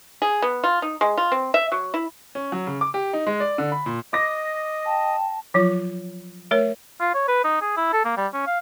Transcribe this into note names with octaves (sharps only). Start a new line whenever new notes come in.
G#4
B3
F4
D#4
G#3
F4
C4
E5
F#3
E4
C#4
F#3
C#3
D6
G4
D#4
G#3
D5
D3
B5
A#2
D#5 D6 A#6
G5 A5
F3 F#3 F4
A3 A#4 C#5
F4
C#5
B4
D#4
G#4
E4
A4
A#3
G3
C#4
F5